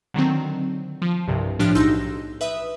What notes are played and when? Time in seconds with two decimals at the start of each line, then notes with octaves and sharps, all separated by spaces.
0.14 D3 D#3 F#3 C4
1.02 F3
1.28 C2 G2 C3
1.59 A2 F3 D4 G4 F6 F#6
1.75 B1 D#4 C6 E6 G6 A#6
2.41 B4 E5 D#6